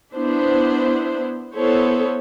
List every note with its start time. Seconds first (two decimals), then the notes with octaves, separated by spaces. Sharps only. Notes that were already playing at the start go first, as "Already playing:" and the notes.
0.14 B3 D4 E4 C5
1.56 B3 E4 A4 C5 C#5